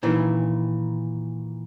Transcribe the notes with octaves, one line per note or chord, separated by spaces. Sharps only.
A#2 D#3 E3